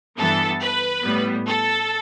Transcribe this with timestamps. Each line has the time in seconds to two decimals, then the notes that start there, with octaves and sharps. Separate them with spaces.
0.18 G2 E3 B3 A4
0.61 B4
1.04 A2 G3 B3
1.48 A4